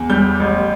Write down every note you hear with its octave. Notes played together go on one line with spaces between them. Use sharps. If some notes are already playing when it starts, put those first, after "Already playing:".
Already playing: E2
G3 G6
A1